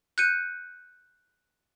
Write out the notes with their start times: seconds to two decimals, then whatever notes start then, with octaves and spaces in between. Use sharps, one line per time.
0.18 F#6 G6 C#7 D#7